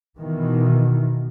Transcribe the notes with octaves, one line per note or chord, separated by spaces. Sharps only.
B2 D#3 E3